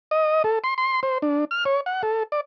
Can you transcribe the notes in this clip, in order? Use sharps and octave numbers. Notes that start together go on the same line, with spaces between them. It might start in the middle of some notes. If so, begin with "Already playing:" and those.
D#5
A4
C6
C6
C5
D4
F6
C#5
F#5
A4
D5